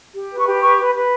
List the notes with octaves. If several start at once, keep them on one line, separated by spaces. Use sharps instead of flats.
G4
B4
C#6
G4
B4 C#6
B4
B4